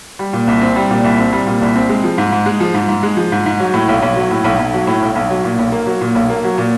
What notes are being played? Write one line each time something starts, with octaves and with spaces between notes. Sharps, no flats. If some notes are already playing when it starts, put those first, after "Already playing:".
G3
A#2
C2
C4
G3
A#2
C2
C4
G3
A#2
C2
C4
G#3
F3
G#2
G#2
G#3
F3
G#2
G#2
G#3
F3
G#2
G#2
F#3
A2
B1
B1
F#3
A2
B1
B1
F#3
A2
B1
B1
F#3
A#2
B1
A#3
F#3
A#2
B1
A#3
F#3
A#2